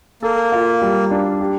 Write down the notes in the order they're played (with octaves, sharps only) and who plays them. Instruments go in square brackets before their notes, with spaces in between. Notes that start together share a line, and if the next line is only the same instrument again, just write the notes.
[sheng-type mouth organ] A#3 [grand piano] A4
[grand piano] F4
G3
D4
G4